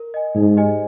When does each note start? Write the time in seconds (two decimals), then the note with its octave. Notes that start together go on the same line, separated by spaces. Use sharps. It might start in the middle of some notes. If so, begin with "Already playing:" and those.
Already playing: A#4
0.14 D#5 G#5
0.35 G#2 D#4
0.57 G4 C5 D#5 G#5